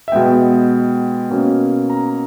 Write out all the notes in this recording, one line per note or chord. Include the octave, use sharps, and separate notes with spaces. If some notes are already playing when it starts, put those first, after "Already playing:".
E5
B2 G#3 B3 G5
B2 A#3 C#4
A#5